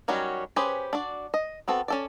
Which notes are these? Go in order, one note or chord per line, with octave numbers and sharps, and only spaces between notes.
D#3 F#3 G3 C#4 F#4
C#4 G4 G#4 B4 C5
D4 F#4 D5
D#5
B3 C4 F#4 A4
C#4 A4 D5